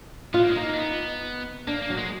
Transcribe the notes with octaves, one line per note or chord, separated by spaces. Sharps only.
B3 F4
A#3
G#3
A#3 D#4
D4
B3
A#3 D4
A#3
F#3
G#3